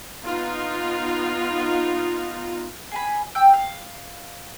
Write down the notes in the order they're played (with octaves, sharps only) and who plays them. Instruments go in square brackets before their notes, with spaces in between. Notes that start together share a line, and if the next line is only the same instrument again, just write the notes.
[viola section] B3 D#4 F4
[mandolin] G#4 G#5 B5
G5 E6 G6
F5